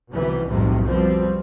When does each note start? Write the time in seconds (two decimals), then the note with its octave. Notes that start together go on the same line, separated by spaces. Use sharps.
0.13 C2 B2 D#3 E3 G3
0.48 B1 F2 A2 C3 D#3 G3
0.86 B2 F3 G3 C4